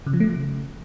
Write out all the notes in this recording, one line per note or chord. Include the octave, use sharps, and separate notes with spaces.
C#3
F3
A3
F3
C#3